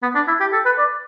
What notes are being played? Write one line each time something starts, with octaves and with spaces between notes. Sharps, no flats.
B3
D4
E4
G4
A4
B4
D5